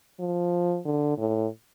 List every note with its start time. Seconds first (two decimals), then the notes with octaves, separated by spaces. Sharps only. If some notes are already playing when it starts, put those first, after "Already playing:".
0.20 F3
0.85 D3
1.18 A2